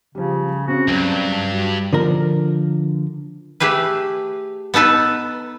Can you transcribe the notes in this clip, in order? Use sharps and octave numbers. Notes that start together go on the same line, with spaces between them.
C#3 F3 G3
C#3 C4 C#4 F#4
C#2 G2 F#3
F#4
D3 F3 A#4
A3 G4 G#4 B4
B3 D#4 A4 B4